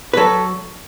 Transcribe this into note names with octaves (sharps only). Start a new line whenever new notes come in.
B4
F#3 A4